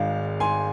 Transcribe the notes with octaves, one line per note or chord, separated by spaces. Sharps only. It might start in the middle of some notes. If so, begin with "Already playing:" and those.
Already playing: G#1 G#2 G#3 F5
G#5 C6